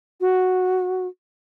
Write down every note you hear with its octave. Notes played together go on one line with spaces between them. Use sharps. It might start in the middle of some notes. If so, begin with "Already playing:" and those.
F#4